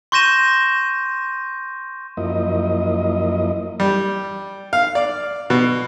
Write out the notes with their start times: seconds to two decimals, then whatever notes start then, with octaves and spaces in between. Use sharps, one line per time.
0.12 C6 C#6 G6 A#6 D#7 E7
2.17 F#2 F3 A#3 E4 D#5
3.80 G3
4.73 F5
4.95 D5
5.50 B2